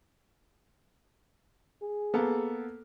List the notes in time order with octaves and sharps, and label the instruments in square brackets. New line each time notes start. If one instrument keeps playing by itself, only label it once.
[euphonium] G#4
[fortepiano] A#3 B3 A4